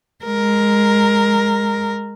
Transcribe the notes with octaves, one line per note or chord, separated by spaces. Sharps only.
G#3 A#4